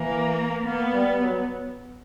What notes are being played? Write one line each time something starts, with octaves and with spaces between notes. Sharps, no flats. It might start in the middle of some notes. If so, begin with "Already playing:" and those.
Already playing: E3 A#3
A#3 B3
G3
F#3